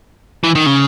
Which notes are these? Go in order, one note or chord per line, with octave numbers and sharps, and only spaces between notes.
E3
D#3
C#3